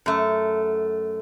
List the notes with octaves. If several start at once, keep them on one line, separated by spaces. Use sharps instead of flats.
F#2 A3